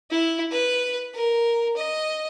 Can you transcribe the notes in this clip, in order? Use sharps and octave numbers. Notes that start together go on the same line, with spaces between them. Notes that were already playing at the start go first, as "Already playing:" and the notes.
E4
B4
A#4
D#5